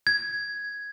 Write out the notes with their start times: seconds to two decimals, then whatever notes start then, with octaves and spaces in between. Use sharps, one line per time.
0.07 G#6